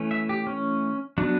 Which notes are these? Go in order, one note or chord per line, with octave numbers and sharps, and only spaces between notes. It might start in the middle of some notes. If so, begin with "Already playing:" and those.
Already playing: E3 A3 C#4
E5
G4
C#4
F#3 B3 D4